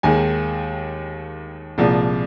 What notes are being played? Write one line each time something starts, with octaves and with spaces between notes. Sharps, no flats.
D#2 D#3 G#3 G#5
C2 A#2 F3 G#3